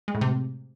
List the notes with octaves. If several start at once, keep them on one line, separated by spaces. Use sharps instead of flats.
G#3
A2
C3